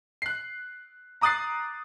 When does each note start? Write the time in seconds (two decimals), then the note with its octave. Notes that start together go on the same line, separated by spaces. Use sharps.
0.22 F#6 C7
1.21 A#5 D6 D#6 F#6 A6 C7